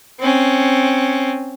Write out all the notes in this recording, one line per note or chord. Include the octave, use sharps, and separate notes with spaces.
C4 C#4